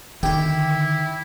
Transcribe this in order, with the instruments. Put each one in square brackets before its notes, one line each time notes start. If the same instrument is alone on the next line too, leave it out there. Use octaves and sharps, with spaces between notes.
[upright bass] D3 D#4 [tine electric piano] D#3 [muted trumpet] E4 [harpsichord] G4